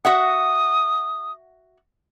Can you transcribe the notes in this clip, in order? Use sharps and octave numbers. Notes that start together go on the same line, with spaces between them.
F#4 E5 F#5 D#6